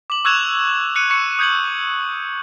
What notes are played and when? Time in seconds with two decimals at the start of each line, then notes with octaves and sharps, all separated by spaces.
0.10 D6 F#7
0.25 C#6 E6 F#6 G#6 E7 F7
0.95 F#6 C#7 D#7
1.10 C#6 C#7
1.39 D#6 G6 G#6 C#7 F#7